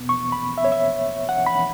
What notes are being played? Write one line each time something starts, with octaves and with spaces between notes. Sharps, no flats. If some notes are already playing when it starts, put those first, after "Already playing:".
Already playing: E2 B2 B3
C#6
B5
E5
C#5
E5
F#5
B5